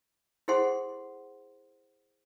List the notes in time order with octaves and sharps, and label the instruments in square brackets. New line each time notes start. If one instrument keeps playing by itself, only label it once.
[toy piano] E4 G#4 A4 C5 F#5 C6